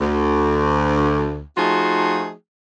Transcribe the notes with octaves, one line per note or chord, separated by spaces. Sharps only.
D2
F3 A3 D#4 F4 F#4 G#4